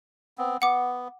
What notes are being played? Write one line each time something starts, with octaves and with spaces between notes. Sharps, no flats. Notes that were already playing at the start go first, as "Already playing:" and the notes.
B3 C4
B3 F#5 D6